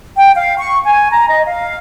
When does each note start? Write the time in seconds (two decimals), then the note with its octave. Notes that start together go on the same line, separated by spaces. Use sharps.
0.17 G5
0.36 F5
0.58 C#6
0.86 G#5
1.12 A#5
1.29 D#5
1.46 F5